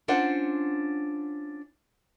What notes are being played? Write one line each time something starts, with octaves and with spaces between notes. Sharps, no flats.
C#4 D4 F4 C5 F#5